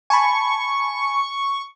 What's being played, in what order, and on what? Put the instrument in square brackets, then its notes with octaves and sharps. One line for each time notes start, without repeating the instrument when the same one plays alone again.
[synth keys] G#5 A5 B5 [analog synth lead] C#6